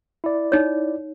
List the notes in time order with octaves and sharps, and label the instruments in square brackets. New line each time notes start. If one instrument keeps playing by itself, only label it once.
[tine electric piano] E4 D5
[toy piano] D#4 C#5